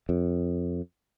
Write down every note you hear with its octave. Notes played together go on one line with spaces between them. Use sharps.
F2